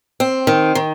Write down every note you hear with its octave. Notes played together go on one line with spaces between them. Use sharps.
C4
D#3
D#3